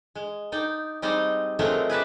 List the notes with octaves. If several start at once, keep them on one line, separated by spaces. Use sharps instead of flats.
G#3
D#4 D5 G5
G3 G#3 C4 D#4 D5 D#5
F#3 G#3 A3 C4 F4 A#4
G#4 B4 D5 E5